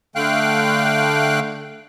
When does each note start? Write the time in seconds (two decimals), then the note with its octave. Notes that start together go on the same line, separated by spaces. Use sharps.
0.16 D3 A3 F5 G5 F#6